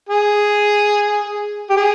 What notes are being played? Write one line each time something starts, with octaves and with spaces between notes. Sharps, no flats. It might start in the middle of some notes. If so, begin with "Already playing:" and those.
G#4
G4
G#4